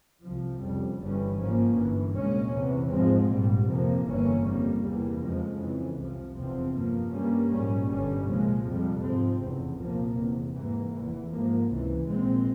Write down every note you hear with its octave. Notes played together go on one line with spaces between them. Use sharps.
C2 C3 F3
F1 F2 C#3 G3
G1 G2 E3 G3 C#4
G#2 F3 A#3 C#4
G1 G2 E3
C2 A#2 G#3 C#4
E2 C3 E3
G#2 F3 G#3 C4
A#1 G#2 G3
F2 C3 F3 A#3
G1 G2 E3 A#3 C#4
F2 C#3 G3 A#3
E2 C3 E3 G3 A#3
F2 C#3 F3 G#3
F2 C#3 E3
C2 C3 F3
F1 E2 C3 F3 C4
G2 F3 A#3
G2 G3 A#3 C#4
A#1 G#2 G3 C#4
G1 G2 G3 C#4
C2 A#2 F3 G#3
F2 C3 G3
G#2 F3 C4
F1 E2 C#3
C2 A#2 F3 A#3
F1 E2 C3
G#2 E3 A#3
F1 E2 E3
G#2 F3 A#3
C#2 C3 E3
A#1 A#2 G#3 C4